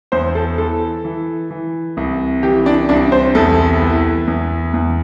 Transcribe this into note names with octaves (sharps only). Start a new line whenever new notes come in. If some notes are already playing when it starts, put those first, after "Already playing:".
E2 C5
A4
E3 A4
E3
E3
C2
E3 G4
D4
C2 D4
C5
E2 A4
E3
E2
E2